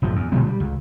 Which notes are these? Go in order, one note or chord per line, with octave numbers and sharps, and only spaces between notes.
F#1 A2 F3
E2
A#2 D3 G#3 B3
G3
C#2